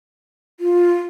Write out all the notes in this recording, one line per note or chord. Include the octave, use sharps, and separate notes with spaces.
F4